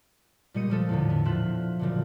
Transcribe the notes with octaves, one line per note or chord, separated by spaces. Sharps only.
A#2 G3 G#3 D#5 C#7 D#7
A#2 F3 A4
E2 A2 D3
B3
A#2 F3 F4 E5 F#6
F#1 A#2 D3